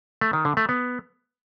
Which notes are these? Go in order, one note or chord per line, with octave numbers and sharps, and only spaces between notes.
A3
D#3
D3
A3
B3